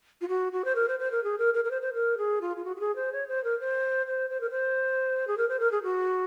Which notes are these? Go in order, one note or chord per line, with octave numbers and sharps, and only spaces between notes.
F4
F#4
F#4
C5
A#4
C5
C5
A#4
G#4
A#4
A#4
A#4
C5
C5
A#4
G#4
F4
F4
F#4
F#4
G#4
C5
C#5
C5
A#4
C5
C5
C5
A#4
C5
G#4
A#4
C5
A#4
G#4
F#4